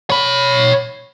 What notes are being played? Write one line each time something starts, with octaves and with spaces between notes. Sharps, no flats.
C#5 B5